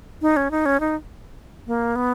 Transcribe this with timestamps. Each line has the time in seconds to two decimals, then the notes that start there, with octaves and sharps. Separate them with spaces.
0.22 D#4
0.36 C#4
0.51 D#4
0.66 C#4
0.80 D#4
1.67 A#3
1.95 B3